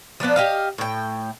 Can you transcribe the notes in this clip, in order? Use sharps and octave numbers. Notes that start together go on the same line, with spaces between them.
F3 A#3 B3 D4
G4 D#5 F5
A2 G5